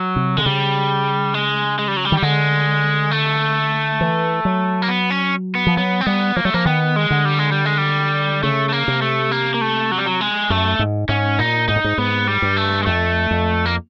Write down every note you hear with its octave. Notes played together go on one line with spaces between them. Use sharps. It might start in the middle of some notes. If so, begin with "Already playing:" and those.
Already playing: F#3
C3
D3 G#3
C#3 G3
G#3
G#3
G3
F#3
G3
D#3
G3
D3 G#3
A3
E3
F#3
A#3
B3
C#4
B3
F3
F#3 B3
C4
G3 B3
F3 A#3
F#3 A3
F3 A#3
D#3 B3
G#3
D3
G3
G#3
G3
G#3
G3
C#3 A3
A3
A#3
C3
A3
A#3
A#3
A3
F#3
G3
F#3
G#3
F#2 A3
G#2
G#2 C#4
A#2 D#4
G#2 D#4
A2
G#2
G#2 B3
G3
G2
A3
G#3
F2 A3
F2
A#3